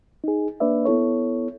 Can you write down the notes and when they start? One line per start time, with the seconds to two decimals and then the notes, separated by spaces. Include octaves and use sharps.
0.24 D#4 G#4
0.60 A#3 D4 B4 D5 E5
0.85 B3 E4 A4 C#5